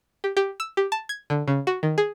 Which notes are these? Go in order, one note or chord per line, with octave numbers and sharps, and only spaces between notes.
G4
G4
E6
G4
A5
G#6
D3
C#3
F#4
D#3
G#4